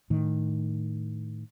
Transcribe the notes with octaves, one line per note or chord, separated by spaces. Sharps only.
A2 D#3